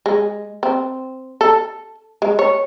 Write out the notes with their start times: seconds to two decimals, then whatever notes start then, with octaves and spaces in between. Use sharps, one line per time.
0.06 G#3
0.63 C4
1.41 A4
2.22 G#3
2.39 C#5